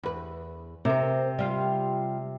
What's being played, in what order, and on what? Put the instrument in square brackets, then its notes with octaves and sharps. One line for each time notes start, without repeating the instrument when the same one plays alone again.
[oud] E2 B4
[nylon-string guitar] C3 [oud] A#4 C5
[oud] G3 F4